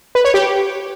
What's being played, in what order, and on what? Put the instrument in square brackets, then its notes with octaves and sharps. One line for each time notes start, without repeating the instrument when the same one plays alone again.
[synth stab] B4
C#5
G4